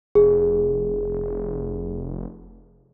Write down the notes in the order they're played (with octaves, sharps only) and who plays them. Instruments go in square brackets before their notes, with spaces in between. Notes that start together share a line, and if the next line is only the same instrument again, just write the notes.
[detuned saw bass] F1 [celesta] G#4